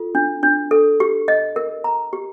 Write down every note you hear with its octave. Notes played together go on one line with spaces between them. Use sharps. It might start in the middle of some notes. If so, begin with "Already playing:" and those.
Already playing: F4 A4
D4
D4
A4
G4
D#5
A#4
A#5
G4